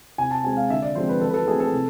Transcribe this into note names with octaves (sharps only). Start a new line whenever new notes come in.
C3 G#5
A5
G#3 C4 G#5
F5
D3 E5
D5
F3 G#3 C4 C5
B4
E3 A4
B4
A4
A3 C4 G#4
A4
C3